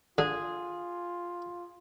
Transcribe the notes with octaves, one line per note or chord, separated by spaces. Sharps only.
D3 F4 G#4